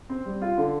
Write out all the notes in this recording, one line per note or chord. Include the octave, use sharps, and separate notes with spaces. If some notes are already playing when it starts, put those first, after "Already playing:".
C4
G3
F4
D3